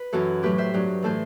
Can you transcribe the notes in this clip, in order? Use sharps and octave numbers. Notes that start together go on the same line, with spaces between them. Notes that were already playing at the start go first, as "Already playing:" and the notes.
Already playing: B4
F#2 E3 F#4 A4
A2 F#3 G4 B4
C5 E5
G2 F#3
A2 E3 A4 C5